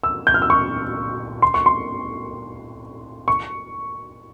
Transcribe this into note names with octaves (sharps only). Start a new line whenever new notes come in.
E6
G6
F6
E6
C#6
C6
C#6
C6
C#6